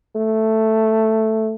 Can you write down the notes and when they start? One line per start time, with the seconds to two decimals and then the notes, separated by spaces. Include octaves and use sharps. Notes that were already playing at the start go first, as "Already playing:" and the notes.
0.16 A3